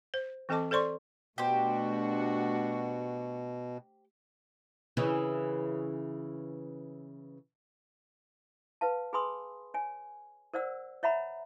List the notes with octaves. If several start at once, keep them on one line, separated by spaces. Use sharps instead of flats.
C5
E3 C4 A4 D#5 A5 D6
A4 C5 D5 C6 C#6
B2 A3 D4 F#4 G4 C5
C#3 E3
B4 F5 A5
G#4 B4 G#5 B5 C6 D#6
C#5 G#5
A#4 C5 D5 F#5 E6
C#5 E5 F#5 A#5 B5